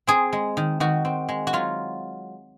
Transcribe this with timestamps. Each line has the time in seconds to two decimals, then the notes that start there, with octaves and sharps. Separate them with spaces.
0.07 C4 G#4
0.33 G#3
0.57 D#3
0.80 D#3 F#4
1.05 C4
1.29 G#3
1.47 F#4
1.53 F#3 F4